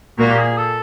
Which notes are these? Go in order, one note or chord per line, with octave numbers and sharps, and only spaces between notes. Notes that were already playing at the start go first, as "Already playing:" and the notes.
A#2 A#3 F#4
G4
G#4
A4